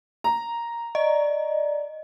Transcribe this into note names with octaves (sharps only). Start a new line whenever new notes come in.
A#5
D5 D#5